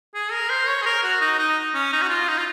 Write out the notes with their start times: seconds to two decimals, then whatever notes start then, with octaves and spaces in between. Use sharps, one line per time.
0.15 G#4
0.32 A#4
0.50 C5
0.68 C#5
0.82 G#4
0.86 A#4
1.03 F#4
1.21 D#4
1.39 D#4
1.74 C#4
1.93 D#4
2.02 F#4
2.10 F4
2.28 D#4
2.37 F4